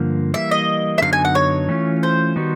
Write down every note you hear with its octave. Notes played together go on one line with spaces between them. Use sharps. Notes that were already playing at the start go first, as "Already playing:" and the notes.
Already playing: G2 D3 F3 A#3
E3 G3 A#3 E5
D#5
E5
F#2 D3 F#3 B3 D#4 F5
G#5
F#5
C#5
E3 A3 C#4 F4
C5
D#3 G3 B3 D#4 F#4